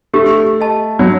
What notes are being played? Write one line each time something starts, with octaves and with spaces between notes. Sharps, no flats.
A3 G4
D#5 A5
F#3